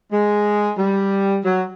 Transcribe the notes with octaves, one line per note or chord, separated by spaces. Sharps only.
G#3
G3
F#3